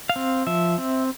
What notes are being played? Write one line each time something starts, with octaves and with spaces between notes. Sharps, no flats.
F5
C4
F3 E5
C4